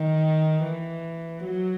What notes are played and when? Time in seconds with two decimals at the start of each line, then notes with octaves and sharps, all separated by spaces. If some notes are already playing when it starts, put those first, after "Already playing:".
Already playing: D#3
0.63 E3
1.45 F#3